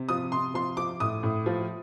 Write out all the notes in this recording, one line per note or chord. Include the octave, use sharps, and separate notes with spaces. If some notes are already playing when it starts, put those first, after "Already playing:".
Already playing: C3
F3 D#6
C3 C6
F3 C6
F3 D6
A2 D#6
A2
F3